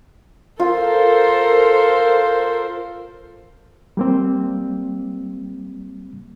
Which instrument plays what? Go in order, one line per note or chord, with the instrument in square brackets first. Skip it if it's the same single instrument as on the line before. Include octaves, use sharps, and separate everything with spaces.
[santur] F4 [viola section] A4 A#4 C5
[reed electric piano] G3 A#3 C4